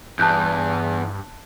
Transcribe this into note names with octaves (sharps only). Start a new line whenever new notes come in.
E2 G2 A5 F#6 G6